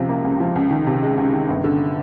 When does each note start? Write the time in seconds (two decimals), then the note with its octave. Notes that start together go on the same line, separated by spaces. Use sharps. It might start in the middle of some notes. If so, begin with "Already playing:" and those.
Already playing: C#2 C3 F3
0.09 A#3
0.24 C#2
0.40 F3
0.56 C#2
0.71 D#3
0.87 C3
1.03 G#3
1.17 C#2
1.34 D#3
1.48 G1
1.64 D3